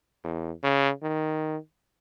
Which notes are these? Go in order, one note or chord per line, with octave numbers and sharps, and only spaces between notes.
E2
C#3
D#3